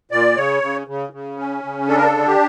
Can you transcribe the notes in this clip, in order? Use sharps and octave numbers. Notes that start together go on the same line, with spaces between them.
A#2 D5
C#3 C#5
C#3
C#3
C#3
C#4
C#3
D4 A4
A#4
A4
D3
G4